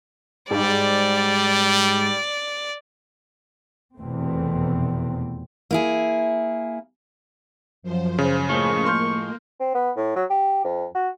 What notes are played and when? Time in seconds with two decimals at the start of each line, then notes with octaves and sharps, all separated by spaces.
0.51 G#2 G3 D5
3.96 F1 E2 B2 A3 C4
5.71 A#3 E4 G#4
7.82 F#2 F3 C5
8.18 C#3
8.49 A2 F3 G#3 A#3 C#6
8.86 C6 F6 G6
9.60 C4
9.75 B3
9.97 A2
10.16 F#3
10.30 G4
10.64 F2
10.95 F#4